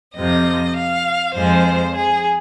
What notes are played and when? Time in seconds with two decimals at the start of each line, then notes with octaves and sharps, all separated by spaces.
0.15 F2 C3 F3 D#5
0.76 F5
1.35 F2 F3 G#3 C5
1.94 G#4